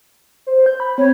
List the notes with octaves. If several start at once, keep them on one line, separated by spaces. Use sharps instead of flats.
C5
G6
B5
C4 C#5